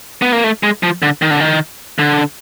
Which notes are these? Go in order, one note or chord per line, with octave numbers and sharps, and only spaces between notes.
B3
A#3
A3
G#3
F3
D3
D#3
D3
D#3
D3